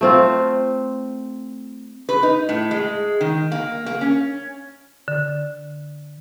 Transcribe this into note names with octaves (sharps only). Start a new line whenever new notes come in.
A3 C4 F4
B4
D#4
A2
G#3
D#3
A#3
A#3
C#4
D3